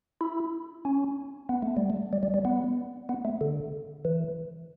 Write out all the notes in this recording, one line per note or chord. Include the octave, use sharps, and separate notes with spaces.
E4
C#4
B3
A3
G3
A3
G3
G3
G3
B3
B3
A3
D3
E3